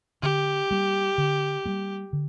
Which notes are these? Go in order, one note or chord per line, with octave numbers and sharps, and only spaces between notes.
D3 G4
G3 A#3
D3
G3 A#3
D3